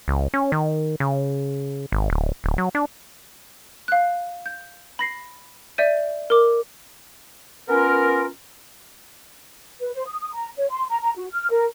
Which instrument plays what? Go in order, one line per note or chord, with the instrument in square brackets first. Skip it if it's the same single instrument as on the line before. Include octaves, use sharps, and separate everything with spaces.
[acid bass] C#2
C#4
D#3
C#3
G#1
D1
D1
F#3
D4
[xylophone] F5 F#6
G6
B5 A#6 C7
D5 E5 G6 D#7
A#4 D6
[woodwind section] B3 C#4 F4 A#4
[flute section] B4
C5
D#6
D#6
A#5
C#5
C6
A#5
A#5
F#4
F6
A#4